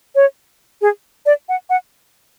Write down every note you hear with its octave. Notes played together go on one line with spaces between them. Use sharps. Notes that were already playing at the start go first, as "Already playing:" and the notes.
C#5
G#4
D5
F#5
F#5